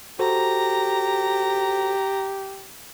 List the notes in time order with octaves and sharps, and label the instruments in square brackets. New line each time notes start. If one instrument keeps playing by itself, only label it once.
[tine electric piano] F#4 A4 C5 [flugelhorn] G4 [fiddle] A#5